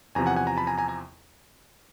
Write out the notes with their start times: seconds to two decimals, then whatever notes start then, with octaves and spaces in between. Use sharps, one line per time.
0.15 E2 C3 F3 G#5 A#5
0.26 F#5 G#5
0.36 F#5 G#5
0.47 G#5 A#5
0.57 A5 B5
0.67 G#5 A#5
0.78 G#5 A#5
0.88 G#5 A#5